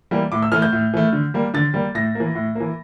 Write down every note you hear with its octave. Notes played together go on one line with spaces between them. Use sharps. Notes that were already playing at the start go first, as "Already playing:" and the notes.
E3 G3 A#3
A2 D6
E6
E3 A3 F6
G6
A2
E3 A3
D3
G3 A#3
D3 A6
G3 A#3
A2 A#6
E3 A#3
A2
E3 A#3